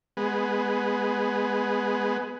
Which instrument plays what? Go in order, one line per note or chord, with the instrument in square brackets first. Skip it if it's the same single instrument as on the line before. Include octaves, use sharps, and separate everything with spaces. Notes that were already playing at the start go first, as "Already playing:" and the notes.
[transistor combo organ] G#3 B3